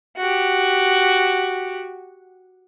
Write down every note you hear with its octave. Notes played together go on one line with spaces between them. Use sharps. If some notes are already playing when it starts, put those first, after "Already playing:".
F#4 G4